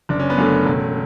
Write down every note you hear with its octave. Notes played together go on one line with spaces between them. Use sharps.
F#1 D4
C#4
B3
F#2 D3 A3 C#4
E1